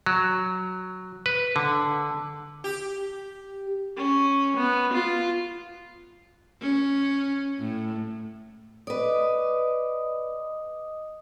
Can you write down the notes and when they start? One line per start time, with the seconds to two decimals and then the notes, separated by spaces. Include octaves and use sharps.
0.06 F#3
1.26 B4
1.56 D3
2.64 G4
3.97 C#4
4.57 B3
4.93 F4
6.61 C#4
7.59 A2
8.87 B4 D5 D#5 D6 D#6